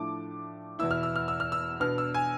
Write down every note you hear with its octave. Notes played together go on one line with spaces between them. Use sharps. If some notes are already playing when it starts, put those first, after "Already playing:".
Already playing: A2 F3 A3 D4 D6
E2 B2 B3 E4 E6
F6
E6
F6
E6
F6
E6
B2 B3 D4 F6
E6
G#5